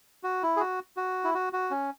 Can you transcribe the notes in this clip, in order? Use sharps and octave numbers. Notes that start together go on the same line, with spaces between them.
F#4
E4
G#4
F#4
F#4
E4
F#4
F#4
C#4